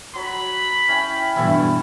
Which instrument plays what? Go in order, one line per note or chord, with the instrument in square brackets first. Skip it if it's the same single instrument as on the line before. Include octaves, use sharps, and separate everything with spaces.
[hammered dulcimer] F#3 [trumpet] B5
[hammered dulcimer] C#4 E4 G5
[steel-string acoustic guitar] G2 B2 E3 [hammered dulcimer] E4 A4